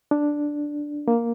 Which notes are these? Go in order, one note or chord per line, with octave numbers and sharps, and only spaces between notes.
D4
A#3